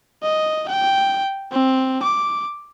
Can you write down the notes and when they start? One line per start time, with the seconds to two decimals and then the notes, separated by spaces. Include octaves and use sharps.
0.23 D#5
0.69 G5
1.52 C4
2.03 D6